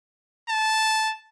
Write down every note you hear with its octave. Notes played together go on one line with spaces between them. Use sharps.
A5